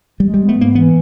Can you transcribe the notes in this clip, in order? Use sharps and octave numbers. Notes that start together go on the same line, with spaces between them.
G3 G#3
G3
B3
A3
G#2 A#3
E3 B3